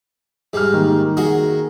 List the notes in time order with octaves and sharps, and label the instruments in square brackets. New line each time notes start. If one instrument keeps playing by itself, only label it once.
[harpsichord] G#2 G3 [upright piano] G#4 F6
[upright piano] D#3 A#3
[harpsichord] F#4 G#4 D#5